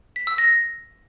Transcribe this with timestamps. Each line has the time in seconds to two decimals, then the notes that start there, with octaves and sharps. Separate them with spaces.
0.16 B6
0.27 E6
0.38 A#6